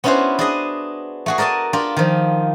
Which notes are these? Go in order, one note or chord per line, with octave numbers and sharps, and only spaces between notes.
B3 C#4 D4 E4 F#4 C5
D4 G#4 D#5
A3 F#4 G#4
A#4 D5 D#5 G#5 A5
D4 F4 G4 A#4
D#3 F3